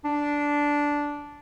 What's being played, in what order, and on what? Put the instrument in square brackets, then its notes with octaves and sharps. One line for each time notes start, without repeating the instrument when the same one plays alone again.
[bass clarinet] D4